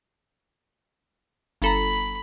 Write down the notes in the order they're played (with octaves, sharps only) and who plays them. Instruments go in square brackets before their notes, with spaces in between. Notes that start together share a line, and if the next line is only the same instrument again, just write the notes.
[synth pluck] G1 A4 A#5 [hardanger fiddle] B5